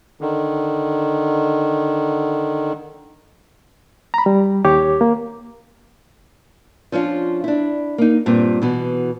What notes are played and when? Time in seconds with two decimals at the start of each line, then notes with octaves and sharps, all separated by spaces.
0.21 D3 D#3
4.14 A#5 B5
4.26 G3
4.65 D#2 G4 C#5 D6
5.01 A#3
6.92 F3 C#4 D4 F4
7.44 D4 E4
7.98 A#3 D#4
8.26 G2 A#2 C4
8.62 B2 E3 F#4